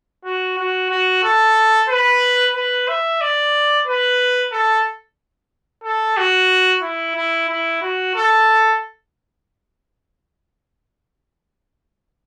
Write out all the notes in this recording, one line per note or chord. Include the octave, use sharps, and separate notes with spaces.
F#4
F#4
F#4
A4
B4
B4
E5
D5
B4
A4
A4
F#4
E4
E4
E4
F#4
A4